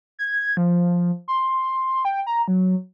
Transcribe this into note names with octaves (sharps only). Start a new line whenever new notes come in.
G#6
F3
C6
G5
A#5
F#3